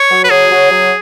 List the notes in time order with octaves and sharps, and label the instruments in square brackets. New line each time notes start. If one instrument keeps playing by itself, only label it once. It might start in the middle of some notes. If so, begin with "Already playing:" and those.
Already playing: [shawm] C#5
[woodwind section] F#3
[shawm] B4
[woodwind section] F#3 [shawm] G#4
[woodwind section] F#3
F#3